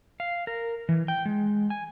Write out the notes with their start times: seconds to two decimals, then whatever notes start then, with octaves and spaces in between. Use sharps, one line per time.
0.20 F5
0.47 A#4
0.89 E3
1.08 G5
1.26 G#3
1.70 G#5